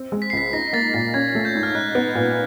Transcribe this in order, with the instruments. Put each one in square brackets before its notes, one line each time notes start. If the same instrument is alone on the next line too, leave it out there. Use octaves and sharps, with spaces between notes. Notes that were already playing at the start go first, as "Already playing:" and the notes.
Already playing: [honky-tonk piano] C4
G#3
[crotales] B6
C7
[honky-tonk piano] C#2 [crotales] B6
[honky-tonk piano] D#4 [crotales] A#6
[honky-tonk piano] A#3 [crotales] A6
[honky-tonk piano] A#2 [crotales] A6
[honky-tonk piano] C#4 [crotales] G#6
[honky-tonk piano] A3
[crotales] G6
[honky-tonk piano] G#2
[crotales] F6
[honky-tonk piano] D#4 [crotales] F#6
[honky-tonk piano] B3
A#2